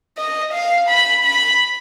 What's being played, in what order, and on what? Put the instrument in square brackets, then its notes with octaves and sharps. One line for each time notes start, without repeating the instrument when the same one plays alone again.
[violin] D#5
F5
B5
B5